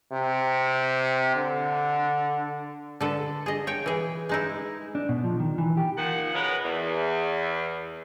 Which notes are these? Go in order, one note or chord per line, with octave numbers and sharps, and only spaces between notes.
C3
D3
D3 A4 B4
G#4 D#5
C#5 G5
E3 G#4
G#3 D#4 E4
D4
B2
F3
D#3
E3
G4
A#2 D#3 F3 F#5
B2 G#3 B3 C#4 A#4 B4
E2